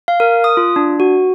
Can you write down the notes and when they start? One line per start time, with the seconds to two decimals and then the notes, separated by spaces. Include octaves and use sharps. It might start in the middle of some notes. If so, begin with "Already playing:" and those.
0.08 F5
0.20 A#4
0.44 D#6
0.57 F4
0.76 D4
1.00 F#4